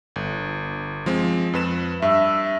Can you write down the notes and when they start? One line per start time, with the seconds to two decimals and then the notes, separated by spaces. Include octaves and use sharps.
0.16 G1
1.06 F3 G#3 C4
1.53 F2 B4 E7
2.02 G2 E5